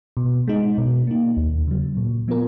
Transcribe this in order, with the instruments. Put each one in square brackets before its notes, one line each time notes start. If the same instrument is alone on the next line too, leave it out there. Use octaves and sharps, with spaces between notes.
[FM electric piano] B2
G#3 D#4
B2
A#3 D#4
D#2
C#3 F#3
A#2
F3 B3 F4 A#4